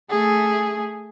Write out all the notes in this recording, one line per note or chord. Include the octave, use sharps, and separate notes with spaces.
A3 G#4